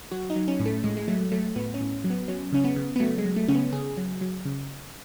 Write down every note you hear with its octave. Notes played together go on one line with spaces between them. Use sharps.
F#3 F#4
D#4
F#3
C#4
A2
A3
A2 G#3
G#3
F#3 A3
F#3 A3
A2 B3
C#4
A2
F#3
B3
F#3 C#4
C#3 C#4
B3
C#3
B3
F#3 A3
G#3
F#3
A3
C#3 C#4
B3
C#3 G#4
F#3
F#3
C#3